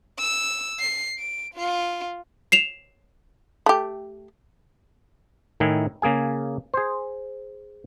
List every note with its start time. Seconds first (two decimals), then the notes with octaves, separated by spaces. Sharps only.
0.19 E6
0.80 C7
1.19 D7
1.55 F4
2.52 C7 E7 F7
3.66 A3 G4
5.60 A2 D#3 D#4 E4 G#5
6.02 C#3 A#3 G#4 G#5
6.74 G#4 C5